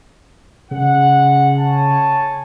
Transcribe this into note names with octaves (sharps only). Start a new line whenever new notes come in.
C#3 G#3 F#5
C#5 G#5 A5